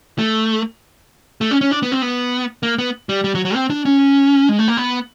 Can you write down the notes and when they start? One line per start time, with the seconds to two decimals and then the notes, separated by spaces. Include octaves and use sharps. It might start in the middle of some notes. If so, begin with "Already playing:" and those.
0.19 A3
1.41 A3
1.51 C#4
1.61 C#4
1.71 D4
1.82 B3
1.92 C4
2.02 B3
2.63 A#3
2.78 B3
3.09 G3
3.24 G3
3.35 F#3
3.45 F#3
3.55 C4
3.70 D4
3.85 C#4
4.49 G#3
4.59 A3
4.68 A#3
4.77 B3